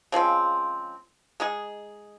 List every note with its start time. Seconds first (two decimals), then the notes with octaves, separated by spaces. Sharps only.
0.12 C#3 F3 G#3 C4
1.40 G#3 D#4 G#4